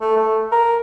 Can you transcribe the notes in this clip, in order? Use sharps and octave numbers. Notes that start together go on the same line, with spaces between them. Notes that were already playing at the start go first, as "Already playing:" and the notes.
A3
A3
A#4